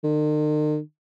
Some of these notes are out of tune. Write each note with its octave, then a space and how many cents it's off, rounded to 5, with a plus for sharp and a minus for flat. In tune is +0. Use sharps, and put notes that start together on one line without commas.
D#3 -45